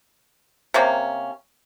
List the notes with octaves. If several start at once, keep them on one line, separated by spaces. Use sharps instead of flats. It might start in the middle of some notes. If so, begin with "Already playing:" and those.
C3 A#3 C#4